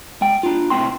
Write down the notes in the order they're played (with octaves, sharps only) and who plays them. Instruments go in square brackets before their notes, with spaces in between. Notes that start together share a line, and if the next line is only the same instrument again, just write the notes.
[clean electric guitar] G#3 G5
D4 F4
A2 C3 A#3 C#4 G5 C6